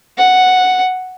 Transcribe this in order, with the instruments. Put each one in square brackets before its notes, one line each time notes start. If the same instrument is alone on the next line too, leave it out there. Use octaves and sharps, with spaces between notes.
[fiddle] F#5